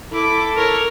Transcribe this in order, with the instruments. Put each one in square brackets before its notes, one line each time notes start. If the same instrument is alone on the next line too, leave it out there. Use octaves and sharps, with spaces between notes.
[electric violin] E4 D6 [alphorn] A4
[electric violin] A#4 C#5